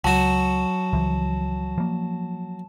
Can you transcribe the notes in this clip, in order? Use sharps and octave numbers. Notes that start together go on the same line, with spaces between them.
C#2 F#3 F#4 A5 E7
C#2 E3 F3
F3 A#3